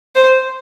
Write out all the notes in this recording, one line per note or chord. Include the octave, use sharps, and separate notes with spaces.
C5